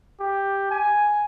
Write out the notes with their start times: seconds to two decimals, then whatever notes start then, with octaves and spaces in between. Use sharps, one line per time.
0.20 G4
0.70 G#5